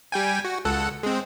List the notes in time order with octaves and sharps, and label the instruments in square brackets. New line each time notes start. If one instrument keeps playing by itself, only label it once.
[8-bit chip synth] G3 G5 G#5
F#4
C#2 A4 F#5
G#3 C4